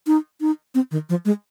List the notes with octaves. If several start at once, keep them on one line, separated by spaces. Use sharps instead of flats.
D#4
D#4
C4
D#3
F3
G#3